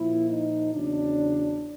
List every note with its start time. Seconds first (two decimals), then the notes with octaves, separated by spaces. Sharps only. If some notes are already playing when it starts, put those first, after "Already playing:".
Already playing: A#2 F3 E4
0.30 D#4
0.73 E2 C#3 F#3 D4